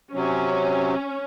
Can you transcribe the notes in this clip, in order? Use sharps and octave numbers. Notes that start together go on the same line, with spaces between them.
C3 F#3 C#4